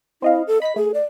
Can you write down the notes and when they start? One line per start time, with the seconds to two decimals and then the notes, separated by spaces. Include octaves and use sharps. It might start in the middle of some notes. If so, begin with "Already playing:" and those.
0.22 C4 E4 D#5 F5
0.47 A4
0.62 D#5 B5 B6
0.76 A3 G#4
0.94 D5